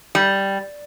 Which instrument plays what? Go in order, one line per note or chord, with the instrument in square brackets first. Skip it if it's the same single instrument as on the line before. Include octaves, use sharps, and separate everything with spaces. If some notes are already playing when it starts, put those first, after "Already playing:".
[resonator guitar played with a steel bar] G3